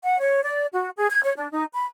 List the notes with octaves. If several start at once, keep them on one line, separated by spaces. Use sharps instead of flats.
F#5
C#5
D5
F#4
G#4
G#6
C#5
D4
D#4
B5